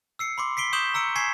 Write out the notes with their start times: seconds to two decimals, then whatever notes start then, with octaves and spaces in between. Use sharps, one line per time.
0.19 E6 C7 C#7
0.38 B5 C6 D6
0.57 B6 C7 D7 G7
0.73 C#6 D#6 G6 E7 F#7 G7
0.94 A#5 E6 C#7 D7 G7
1.16 G#5 C#6 G#6 B6 C7 E7